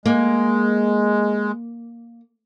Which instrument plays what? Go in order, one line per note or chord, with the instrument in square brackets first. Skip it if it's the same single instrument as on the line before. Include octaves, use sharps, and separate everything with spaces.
[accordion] G#3 [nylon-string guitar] A#3